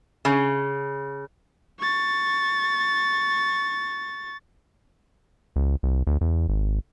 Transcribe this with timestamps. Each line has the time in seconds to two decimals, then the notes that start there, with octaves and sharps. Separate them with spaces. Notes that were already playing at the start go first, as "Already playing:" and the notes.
0.25 C#3
1.79 C#6 A6
5.56 C#2
5.83 C2
6.07 D2
6.21 E2
6.49 G#1